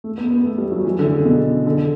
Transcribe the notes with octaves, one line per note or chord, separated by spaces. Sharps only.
A3
B3
B3
A3
G3
F#3
E3
D3
C#3
B2
D3